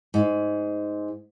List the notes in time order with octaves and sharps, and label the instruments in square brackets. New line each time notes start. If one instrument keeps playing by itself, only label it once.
[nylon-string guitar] G#2